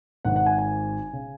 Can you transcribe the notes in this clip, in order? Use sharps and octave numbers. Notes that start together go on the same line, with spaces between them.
G#1 G#2 D#3 F#5
F#5
G#5
G#5
C#3